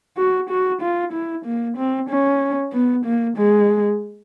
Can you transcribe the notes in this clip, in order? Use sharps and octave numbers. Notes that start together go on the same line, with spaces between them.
F#4
F#4
F4
E4
A#3
C4
C#4
B3
A#3
G#3